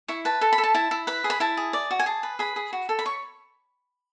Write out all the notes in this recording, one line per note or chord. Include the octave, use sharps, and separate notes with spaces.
E4 C#6
B4 A5
A4 A5
B5
A4
A5
E4 A5
E4
B4 B5
G#4
B5
E4 A5
G#4
D5
F#4
G#5
G#4 A5
B4
G#4 B5
G#4
F#4
A4
B5
C#5 C#6